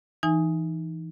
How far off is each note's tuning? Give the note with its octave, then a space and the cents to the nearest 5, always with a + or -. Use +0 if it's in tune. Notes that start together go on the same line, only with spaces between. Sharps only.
E3 +0 D#4 +0 G#5 +0